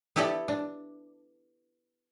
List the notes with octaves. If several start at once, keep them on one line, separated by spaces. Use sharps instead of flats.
B3 E4 G4 A4 D5
D4